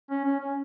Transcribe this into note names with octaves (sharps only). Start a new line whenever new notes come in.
C#4
C#4
C#4